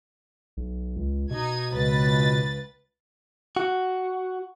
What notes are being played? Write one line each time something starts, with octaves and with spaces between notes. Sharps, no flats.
B1
C#2
B2 D#4 G#6
C#2 B4 A6
F#4